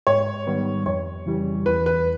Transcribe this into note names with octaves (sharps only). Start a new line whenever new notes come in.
G#2 C#5
D#3 G3 B3
F2 C#5
C#3 E3 G3
E2 B4
B4